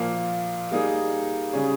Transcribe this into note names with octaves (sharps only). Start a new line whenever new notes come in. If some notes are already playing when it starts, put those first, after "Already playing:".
Already playing: A#2 F3 A#3
G3 A#3 D#4 G#4
C#3 G3 C#4 G#4